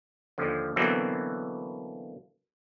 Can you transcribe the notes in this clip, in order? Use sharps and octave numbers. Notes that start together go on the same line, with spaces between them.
D#2 D3 F3
B2 D3 E3 F#3 A#3 C4